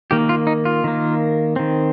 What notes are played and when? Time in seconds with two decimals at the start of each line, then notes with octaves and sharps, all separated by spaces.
0.11 D#3 A#3 G4
0.29 F4
0.47 D#4
0.65 F4
0.84 D#3 A#3
1.56 D#3 C4